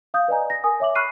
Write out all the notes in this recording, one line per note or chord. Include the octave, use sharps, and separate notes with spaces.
F5 D#6 G6
B4 D5 D#5 G#5 A#5
A#6
A#4 G#5 D#6
C#5 E5 D6 F#7
B5 C#6 F6 F#6 C7 D#7